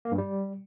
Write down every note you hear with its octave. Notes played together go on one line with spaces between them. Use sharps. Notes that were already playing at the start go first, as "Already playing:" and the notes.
A#3
G2
G3